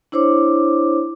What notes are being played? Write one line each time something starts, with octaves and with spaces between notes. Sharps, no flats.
D4 E4 C5 C#5 D6